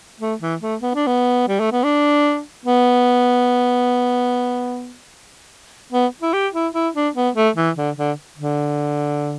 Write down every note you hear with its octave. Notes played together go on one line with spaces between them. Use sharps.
A3
E3
A3
B3
D4
B3
G3
A3
B3
D4
B3
B3
E4
G4
E4
E4
D4
B3
A3
E3
D3
D3
D3